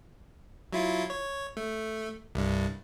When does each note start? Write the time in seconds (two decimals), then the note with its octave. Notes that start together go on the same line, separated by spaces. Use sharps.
0.73 F#3 E4 F4
1.10 C#5
1.57 A3
2.35 C2 G2